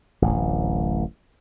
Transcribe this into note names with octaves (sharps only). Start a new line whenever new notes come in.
D1 A1